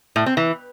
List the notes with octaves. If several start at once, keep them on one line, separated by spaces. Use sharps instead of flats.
A2
C4
E3